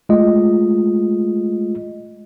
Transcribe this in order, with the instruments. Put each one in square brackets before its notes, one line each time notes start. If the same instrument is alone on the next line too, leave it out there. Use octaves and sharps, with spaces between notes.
[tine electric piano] G#3 A3 F4 D#5